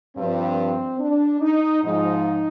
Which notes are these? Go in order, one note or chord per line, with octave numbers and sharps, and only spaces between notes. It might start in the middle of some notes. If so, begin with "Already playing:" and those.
G2 F3 C4
D4
D#4
G#2 F3 D#4